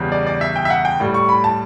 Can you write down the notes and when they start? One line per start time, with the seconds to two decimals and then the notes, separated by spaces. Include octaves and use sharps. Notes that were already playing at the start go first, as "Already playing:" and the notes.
Already playing: E2 C#3 G3
0.12 D5
0.26 D5
0.41 E5
0.56 G5
0.65 E5
0.70 F#5
0.85 G5
1.00 A2 G3
1.14 C#6
1.29 B5
1.44 A5